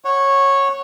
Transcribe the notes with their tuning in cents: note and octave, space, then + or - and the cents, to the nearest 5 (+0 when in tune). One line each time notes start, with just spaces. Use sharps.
C#5 -10 F#5 +5